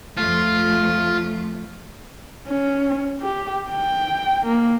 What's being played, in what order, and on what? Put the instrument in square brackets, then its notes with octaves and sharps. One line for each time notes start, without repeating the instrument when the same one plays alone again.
[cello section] F2 F3 A3 [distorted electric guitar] F4
[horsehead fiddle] C#4
G4
G5
A#3